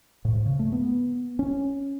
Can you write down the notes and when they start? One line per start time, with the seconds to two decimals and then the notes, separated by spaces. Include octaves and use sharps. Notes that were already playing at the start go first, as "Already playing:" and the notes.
0.25 A2
0.33 G#2
0.46 C#3
0.59 A3
0.72 B3
1.39 C#4